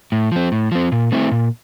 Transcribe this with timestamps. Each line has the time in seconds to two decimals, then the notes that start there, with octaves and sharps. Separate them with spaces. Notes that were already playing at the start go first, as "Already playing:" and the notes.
0.12 A2
0.32 F3 C4
0.52 A2
0.72 F3 C4
0.92 A#2
1.12 A3 C4 E4
1.32 A#2